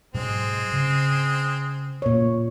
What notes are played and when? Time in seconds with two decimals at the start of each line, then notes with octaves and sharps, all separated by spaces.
0.14 G#2 B2 F#3 G#3 C4
0.72 C#3
2.02 A#2 C#5